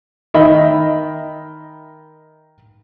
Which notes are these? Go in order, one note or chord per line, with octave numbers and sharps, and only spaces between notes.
D#3 D#5 E5 B5